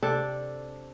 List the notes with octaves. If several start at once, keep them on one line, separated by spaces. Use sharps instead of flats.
C3 D4 A4 D5